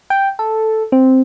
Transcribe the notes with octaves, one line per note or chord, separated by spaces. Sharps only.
G5
A4
C4